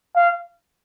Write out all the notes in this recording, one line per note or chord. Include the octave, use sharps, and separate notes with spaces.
F5